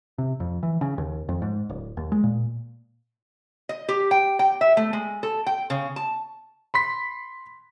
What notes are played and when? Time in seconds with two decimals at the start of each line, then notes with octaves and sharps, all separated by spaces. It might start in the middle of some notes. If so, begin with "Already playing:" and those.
0.18 C3
0.40 F2
0.63 E3
0.81 C#3
0.98 D#2
1.29 F2
1.42 G#2
1.69 D1
1.97 D#2
2.12 G#3
2.23 A#2
3.69 D#5
3.89 G4
4.11 G5
4.39 G5
4.61 E5
4.77 A3
4.93 G#3
5.23 A4
5.46 G5
5.70 C#3
5.96 A5
6.74 B5 C6 B6